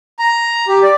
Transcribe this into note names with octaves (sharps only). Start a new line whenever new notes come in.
A#5
G4
D5